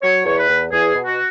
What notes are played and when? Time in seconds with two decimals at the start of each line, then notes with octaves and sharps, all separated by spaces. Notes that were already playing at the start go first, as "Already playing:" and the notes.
0.03 F#3 C#5
0.25 E2 C#5
0.37 B4
0.48 E2
0.71 E2 G#4
0.94 B2
1.06 F#4